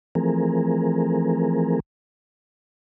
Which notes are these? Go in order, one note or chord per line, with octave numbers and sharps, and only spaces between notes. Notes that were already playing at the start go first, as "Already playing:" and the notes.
E3 F3 A3 C4 G#4 A#4